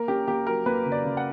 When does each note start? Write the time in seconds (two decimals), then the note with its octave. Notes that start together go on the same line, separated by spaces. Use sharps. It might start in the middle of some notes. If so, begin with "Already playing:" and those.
Already playing: A#3 A#4
0.08 C#4 G4
0.28 A#3 G4
0.47 F#3 A#4
0.66 A#3 B4
0.86 C#3
0.92 D5
1.05 C#3
1.17 F#5